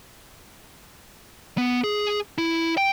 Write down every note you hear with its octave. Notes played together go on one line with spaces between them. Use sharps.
B3
G#4
E4
G5